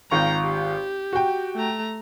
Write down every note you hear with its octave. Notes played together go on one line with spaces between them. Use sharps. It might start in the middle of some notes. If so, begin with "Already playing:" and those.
G#1 F4 G5 A#5 C#6
G4
F#4 G5
A3 A#5